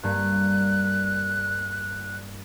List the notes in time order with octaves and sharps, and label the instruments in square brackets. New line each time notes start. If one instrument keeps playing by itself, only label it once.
[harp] G2 A#3 [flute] F#6